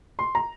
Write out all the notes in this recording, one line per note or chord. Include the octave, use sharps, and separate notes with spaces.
C6
A#5